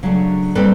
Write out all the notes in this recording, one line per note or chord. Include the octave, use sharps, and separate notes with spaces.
C#3 F#3 A3 D4
A#2 G3 C4 D#4 A4 B4